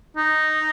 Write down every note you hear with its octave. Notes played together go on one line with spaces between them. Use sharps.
D#4